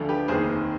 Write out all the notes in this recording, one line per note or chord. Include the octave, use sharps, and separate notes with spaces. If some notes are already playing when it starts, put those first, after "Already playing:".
Already playing: D2 D3 F3
G4 B4
F1 D#2 D#3 G#4 C5